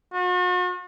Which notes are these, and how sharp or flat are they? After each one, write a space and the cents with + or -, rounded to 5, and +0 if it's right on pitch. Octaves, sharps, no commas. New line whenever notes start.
F#4 -45